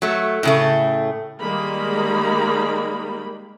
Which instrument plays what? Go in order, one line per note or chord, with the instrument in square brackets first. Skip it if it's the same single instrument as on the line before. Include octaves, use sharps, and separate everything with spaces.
[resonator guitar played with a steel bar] F#3 A3
A2 C#3 A3
[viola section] D#3 G3 G#3 A#3 B5